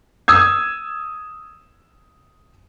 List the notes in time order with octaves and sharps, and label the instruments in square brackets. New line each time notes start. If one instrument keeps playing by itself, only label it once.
[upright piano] D#6 E6 G#6